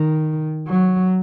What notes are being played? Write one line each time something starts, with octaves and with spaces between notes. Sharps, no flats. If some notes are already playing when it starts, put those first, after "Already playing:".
Already playing: D#3
F#3